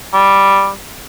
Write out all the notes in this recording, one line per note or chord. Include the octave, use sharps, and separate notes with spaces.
G3